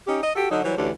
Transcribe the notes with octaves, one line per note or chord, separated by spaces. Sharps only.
C#4 D#4 G4
D#5
F#4 G4 A4
D3 F#3 D#4
E3 F#3 G3 C5 C#5
D2 E3 C#4 D4 G4